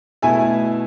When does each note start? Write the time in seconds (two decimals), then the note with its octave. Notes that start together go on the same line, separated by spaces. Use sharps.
0.22 B2 A3 E4 E5 G#5